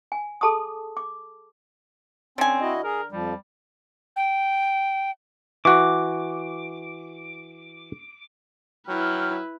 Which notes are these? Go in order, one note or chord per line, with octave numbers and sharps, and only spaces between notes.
G#5
G#4 A4 A5 C6 D6 D#6
D6
D3 C4 C#4 G#5
E4 F#4 D#5
G#4 A#4
F2 F3 G3
G5
E3 F#4 D6
F#3 E4 B4 G5 F6